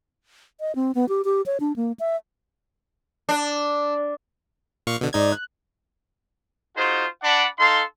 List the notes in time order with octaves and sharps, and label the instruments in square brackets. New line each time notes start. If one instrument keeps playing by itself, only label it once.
[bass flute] D#5
C4
B3
G4
G4
C#5
D4
A#3
E5
[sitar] D4
[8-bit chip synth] A#2 F5 C#6
B2 D3
[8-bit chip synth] G#2 D#4 G#6 [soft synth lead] D5
[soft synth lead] F#6
[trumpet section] D#4 F4 F#4 G#4 C5
D4 D5 F#5 A5 B5 D6
D#4 A4 F5 C6